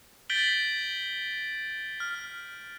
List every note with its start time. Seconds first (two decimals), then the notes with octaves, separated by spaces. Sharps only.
0.30 G6 A6 B6 D7 F#7 G7
2.00 F6